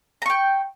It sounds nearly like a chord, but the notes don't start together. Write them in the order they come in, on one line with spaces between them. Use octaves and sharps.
A#5 C#6 G5